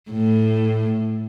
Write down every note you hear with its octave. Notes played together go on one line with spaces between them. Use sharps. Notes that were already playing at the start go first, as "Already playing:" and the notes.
A2